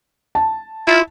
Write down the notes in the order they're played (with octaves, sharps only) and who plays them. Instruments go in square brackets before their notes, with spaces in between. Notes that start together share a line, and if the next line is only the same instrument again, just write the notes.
[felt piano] A5
[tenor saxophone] E4 [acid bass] F4